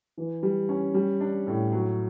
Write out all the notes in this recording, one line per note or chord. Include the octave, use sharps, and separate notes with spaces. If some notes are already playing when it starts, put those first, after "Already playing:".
E3
G3
C#4
G3
D4
A2
F#3